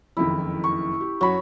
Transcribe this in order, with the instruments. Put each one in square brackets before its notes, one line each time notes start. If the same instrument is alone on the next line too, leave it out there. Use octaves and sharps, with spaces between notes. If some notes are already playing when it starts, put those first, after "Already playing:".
[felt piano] F#1 F2 D#3 [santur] E4
[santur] C#6
[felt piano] G4
[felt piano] F#2 F#4 [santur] C#5 B5